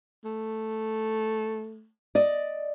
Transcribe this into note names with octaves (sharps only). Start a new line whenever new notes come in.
A3
D5 D#5